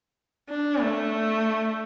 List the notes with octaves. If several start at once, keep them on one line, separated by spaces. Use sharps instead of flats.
D4
A3